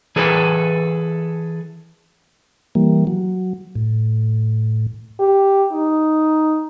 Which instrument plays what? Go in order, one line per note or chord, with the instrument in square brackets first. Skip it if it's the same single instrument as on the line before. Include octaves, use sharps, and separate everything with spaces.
[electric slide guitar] E3 G#4 A4 B4
[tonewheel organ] E3 G3 A#3
F#3
A2
[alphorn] G4
D#4